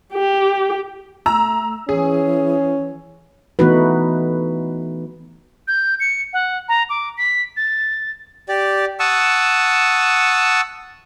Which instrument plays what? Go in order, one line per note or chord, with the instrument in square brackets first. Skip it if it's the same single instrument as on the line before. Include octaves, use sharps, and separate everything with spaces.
[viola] G4
[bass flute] A3 [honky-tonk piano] A#5 E6
[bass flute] E3 [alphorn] C#4 [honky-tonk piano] G#4
[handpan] E3 A3 B3 D#4 F#4 B4
[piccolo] G6
C#7
F#5
A#5
D6
B6
A6
[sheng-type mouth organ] G4 D5
F#5 A5 C#6 D#6 E6